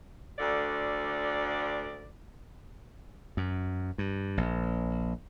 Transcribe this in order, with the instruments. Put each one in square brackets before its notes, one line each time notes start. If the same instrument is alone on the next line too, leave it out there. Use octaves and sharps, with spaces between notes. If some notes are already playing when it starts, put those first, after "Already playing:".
[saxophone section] D2 D3 D5
[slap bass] F#2
G2
A#1